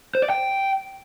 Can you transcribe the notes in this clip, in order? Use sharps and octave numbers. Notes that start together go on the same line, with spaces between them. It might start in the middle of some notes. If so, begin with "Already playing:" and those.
C5
D5
G5